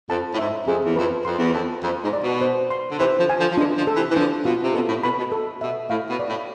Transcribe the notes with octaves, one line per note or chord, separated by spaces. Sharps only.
F2 A5
A2
G#2 E5
F2 G#4
E2
F2 B4
F2 C6
E2
F2 A5
F2 A4
G#2
D5
B2
C5
C6
D3
C3 E3 C5
D3 F3
G#5
D3 F3
F3
E3 G#3 D4
D3 F3
A4
C3 E3
E3
D3 F3 D4
B2 F4
C3
B2 A4
A2
B2 B5
B2
A4
B2 E5
A2 F5
B2
D5
A2